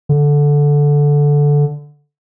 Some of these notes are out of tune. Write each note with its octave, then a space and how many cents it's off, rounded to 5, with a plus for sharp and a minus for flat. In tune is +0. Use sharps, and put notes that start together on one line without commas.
D3 -10